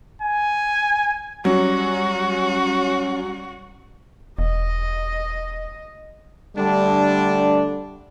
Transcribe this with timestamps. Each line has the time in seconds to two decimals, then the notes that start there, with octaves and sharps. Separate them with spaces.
0.22 G#5
1.45 F#3 G3 C#4 F#4
4.39 E1 D#5
6.57 D3 G3 A3 D4